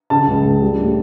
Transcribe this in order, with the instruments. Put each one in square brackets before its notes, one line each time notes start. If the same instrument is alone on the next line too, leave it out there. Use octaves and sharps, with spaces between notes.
[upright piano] C#3 A5
C#2
C#2
G3
A2